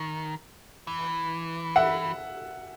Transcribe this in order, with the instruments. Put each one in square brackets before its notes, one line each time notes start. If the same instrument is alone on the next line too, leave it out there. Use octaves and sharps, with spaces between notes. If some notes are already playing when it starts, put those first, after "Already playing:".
Already playing: [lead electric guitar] D#3
E3
[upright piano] E5 F#5